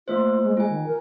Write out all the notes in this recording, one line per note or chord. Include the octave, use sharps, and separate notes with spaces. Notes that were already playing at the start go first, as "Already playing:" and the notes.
A3 A#3 F4 C5
G#3
G#3 F4 G#5
D#3
A#4